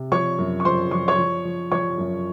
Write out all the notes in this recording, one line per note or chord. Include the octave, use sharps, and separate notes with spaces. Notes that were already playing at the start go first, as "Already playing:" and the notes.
Already playing: C3
F3 C#5 C#6
F#2
C#6
F3 C5 C6
F3 C#6
C#5 C#6
F3
F3
F3 C#5 C#6
F#2